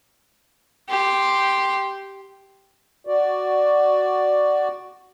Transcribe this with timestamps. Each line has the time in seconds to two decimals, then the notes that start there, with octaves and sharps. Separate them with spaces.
0.89 G4 C6
3.07 F#4 D5